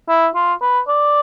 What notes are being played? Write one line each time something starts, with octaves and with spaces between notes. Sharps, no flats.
E4
F4
B4
D5